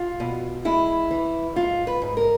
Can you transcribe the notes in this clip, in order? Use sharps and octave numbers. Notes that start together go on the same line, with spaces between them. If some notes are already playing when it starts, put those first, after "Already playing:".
Already playing: F4
B2
G#3 E4
E3
G#2 F4
B4
G#2
A#4